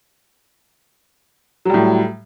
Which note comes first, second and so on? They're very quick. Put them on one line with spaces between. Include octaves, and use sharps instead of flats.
F#3 G3 A2